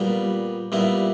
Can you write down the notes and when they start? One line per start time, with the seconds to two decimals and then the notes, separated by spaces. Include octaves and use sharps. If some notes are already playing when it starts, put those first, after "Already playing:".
Already playing: A#2 G3 B3
0.72 A#2 G3 B3 E4